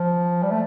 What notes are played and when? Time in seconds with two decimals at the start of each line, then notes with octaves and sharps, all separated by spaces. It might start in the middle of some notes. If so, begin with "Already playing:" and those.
Already playing: F3
0.43 G3
0.52 A3